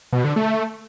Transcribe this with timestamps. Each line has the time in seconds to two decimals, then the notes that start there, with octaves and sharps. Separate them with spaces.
0.13 B2
0.24 D3
0.36 A3